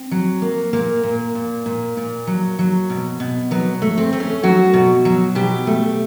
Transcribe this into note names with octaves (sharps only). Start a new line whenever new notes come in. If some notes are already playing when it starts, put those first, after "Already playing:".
Already playing: C4
F#3
A#3
A#2 A#3
A#2
A#2
A#2
A#2
F#3
F#3
B2
B2
F#3 B3
A3
C4
A3
C#4
F#3 F#4
B2
F#3
B2 G4
A3